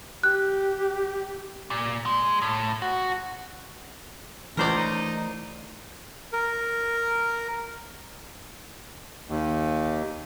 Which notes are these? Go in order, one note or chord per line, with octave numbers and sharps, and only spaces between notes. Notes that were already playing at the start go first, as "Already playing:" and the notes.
G4 F#6
A#2
G#3
A2
F#4
C#2 E3 A3 A#4 C5 D5
D#4
A#4
D#2